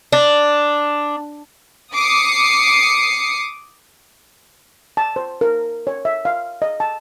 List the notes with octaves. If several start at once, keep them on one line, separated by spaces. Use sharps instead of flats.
D4
D6 D#6 C7 C#7
A5
C5
A#4
C#5
E5
F5
D#5
A5